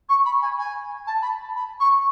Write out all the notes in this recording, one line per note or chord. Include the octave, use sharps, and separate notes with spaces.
C#6
B5
G#5
G#5
A5
B5
B5
C#6